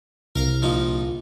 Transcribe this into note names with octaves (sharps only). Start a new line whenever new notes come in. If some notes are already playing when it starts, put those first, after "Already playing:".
C2 A#4 F5 A#5
A#1 F3 D#4